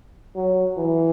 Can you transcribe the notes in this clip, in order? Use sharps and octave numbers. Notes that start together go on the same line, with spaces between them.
F#3
E3